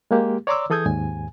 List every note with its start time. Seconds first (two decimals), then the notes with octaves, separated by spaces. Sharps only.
0.11 G#3 A#3 G4
0.47 C#5 D5 A#5 C6 D6 E6
0.70 E3 G#4 A4 D#6 G6 G#6
0.86 D#2 G#2 G#5